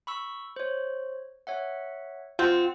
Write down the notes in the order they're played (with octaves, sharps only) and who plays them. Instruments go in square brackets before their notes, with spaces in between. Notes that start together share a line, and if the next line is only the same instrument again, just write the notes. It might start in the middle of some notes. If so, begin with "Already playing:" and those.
[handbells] B5 C#6 E6
C5 C#5
C#5 E5 F#5
[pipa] C4 [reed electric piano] F4 [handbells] F#5